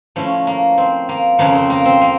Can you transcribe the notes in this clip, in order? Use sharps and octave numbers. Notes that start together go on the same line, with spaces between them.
A2 F3 C#4
A#3
C4
A#3
F2 C#3 F3 A#3
C4
A#3
C4
A#3